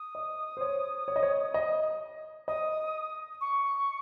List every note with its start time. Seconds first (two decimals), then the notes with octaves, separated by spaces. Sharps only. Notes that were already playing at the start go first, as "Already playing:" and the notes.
Already playing: D#6
0.15 D#5
0.57 C5
0.61 C#5
1.08 C#5
1.16 D#5
1.23 C#5
1.54 D#5
2.48 D#5 D#6
3.40 C#6